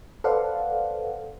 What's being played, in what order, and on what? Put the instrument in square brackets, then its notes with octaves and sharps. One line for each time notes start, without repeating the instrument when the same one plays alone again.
[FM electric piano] A4 B4 C5 D5 F5 F#5